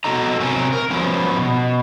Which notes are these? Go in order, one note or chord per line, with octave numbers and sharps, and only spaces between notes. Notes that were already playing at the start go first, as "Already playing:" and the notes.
B3 F#4 A4 D#5 A#5
C3 F#3 C4 A#4 G#5
A#4
F3 F#3 B3 C#4
B2